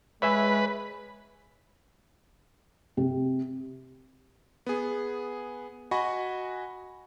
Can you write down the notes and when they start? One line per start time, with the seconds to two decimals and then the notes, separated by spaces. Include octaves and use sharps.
0.22 G#3 B4 C#5 E5 G#5
2.97 C3
4.67 B3 G#4
5.91 F#4 D#5 F#5 G#5 B5 C#6